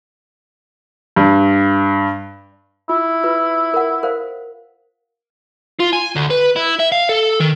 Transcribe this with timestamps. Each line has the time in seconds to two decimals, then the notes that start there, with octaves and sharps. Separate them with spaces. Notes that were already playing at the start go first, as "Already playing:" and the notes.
1.16 G2
2.89 E4 F4
3.23 F4 B4
3.74 A#4 F#5
4.03 A#4 C5 F5
5.80 F4
5.93 G#5
6.16 D2
6.30 B4
6.56 E4
6.79 E5
6.92 F5
7.09 A4
7.40 D#3